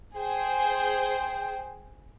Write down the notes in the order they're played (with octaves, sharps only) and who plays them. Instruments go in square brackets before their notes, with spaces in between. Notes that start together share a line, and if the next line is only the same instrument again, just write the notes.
[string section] G#4 C5 [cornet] G5